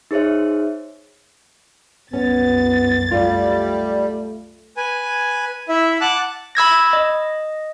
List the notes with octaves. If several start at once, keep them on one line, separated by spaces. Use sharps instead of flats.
D#4 G#4 C5 C#5 E5
C2 F#2 B3 C#4 A6
G3 A3 F4
B4 G#5
E4 E5
F#5 A5 D6 F#6
B5 E6 G#6 A#6
D#5